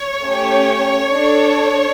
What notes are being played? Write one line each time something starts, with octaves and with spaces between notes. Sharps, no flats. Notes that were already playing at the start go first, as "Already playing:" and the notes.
Already playing: C#5
A3 C#4 G4
D4 A4